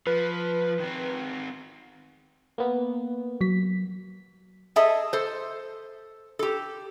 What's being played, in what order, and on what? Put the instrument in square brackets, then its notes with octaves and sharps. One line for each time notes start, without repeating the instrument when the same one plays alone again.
[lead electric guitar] F3 [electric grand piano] B4
[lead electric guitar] D#3 C4
[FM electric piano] A#3 B3
[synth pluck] F#3 B6
[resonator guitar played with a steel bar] G#4 A4 D#5 E5 A5
A4 C5
G4 A4